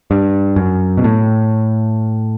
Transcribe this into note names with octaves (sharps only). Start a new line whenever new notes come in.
G2
F#2
B2
A2